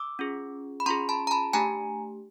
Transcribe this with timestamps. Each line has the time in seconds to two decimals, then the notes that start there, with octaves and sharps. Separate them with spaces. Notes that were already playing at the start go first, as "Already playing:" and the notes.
Already playing: D6 E6
0.19 C#4 F4 G#4
0.80 B5
0.86 C#4 F4 G#4 A#5 C6
1.09 A5 B5
1.27 A#5
1.31 A5 B5
1.53 A3 D4 G4 G#5 A#5